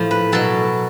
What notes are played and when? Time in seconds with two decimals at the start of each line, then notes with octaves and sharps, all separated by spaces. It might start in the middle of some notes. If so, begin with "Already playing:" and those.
Already playing: A2 F3
0.11 B4
0.32 B2 F#3 A4